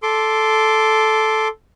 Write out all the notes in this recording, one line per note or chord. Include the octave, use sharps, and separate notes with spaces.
A4 C6 D6